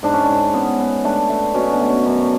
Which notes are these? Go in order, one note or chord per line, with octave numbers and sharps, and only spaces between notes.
G#2 D4
C#4
D4
G#2
B3 C#4
B3
A3 D4
A3
B2 C#4
D4
A3
C#4
F#2